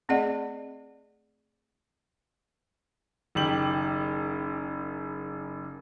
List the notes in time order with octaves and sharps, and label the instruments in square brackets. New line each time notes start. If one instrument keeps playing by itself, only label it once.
[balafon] A3 C4 G#4 D5 D#5 F#5
[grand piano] F#1 D#3 G4 F#7